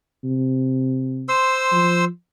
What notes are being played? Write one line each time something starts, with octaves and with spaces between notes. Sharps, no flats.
C3
C5 C6 E6
F3